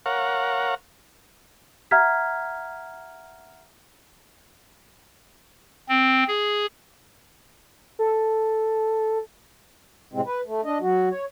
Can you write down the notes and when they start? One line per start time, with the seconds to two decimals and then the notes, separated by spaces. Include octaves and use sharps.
0.06 A#4 C#5 F5 F#5
1.91 E5 F#5 A#5 F6 G#6 B6
5.89 C4
6.28 G#4
7.99 A4
10.13 A2 C3 G#3 C4
10.26 B4
10.46 A3
10.65 D4 D#5
10.81 F#3 F#4
11.11 C#5